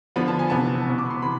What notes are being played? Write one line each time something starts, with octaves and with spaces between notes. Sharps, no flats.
D3 F3 B3 B5
A5
G#5
C3 E3 B3 A5
B2 B3
D6
B5
C6
C3 E3 B5